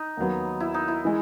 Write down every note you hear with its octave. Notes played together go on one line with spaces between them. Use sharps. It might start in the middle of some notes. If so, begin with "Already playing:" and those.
Already playing: D#4
D#2 D#3 F#3 B3
E4
D#4
E4
E3 G#3